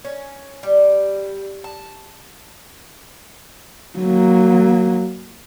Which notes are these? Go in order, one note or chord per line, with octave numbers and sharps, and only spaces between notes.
C#4
G3
A5
F#3 A#3